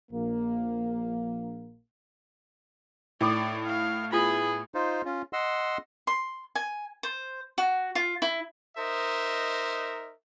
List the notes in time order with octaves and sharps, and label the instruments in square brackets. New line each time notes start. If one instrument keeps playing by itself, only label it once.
[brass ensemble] A#1 A#3
[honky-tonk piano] A2 [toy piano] D#4 A4 D6 [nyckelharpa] D5
[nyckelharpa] F5
[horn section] B3 E4 G#4 [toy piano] F4 [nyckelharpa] B5
[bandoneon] D#4 F4 C5
C#4 F4
D#5 F#5 C6 E6
[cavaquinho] C6
G#5
C5
F#4
F4
E4
[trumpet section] D#4 A#4 C5 D#5 E5